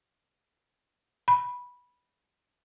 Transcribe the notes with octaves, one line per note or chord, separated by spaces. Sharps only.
B5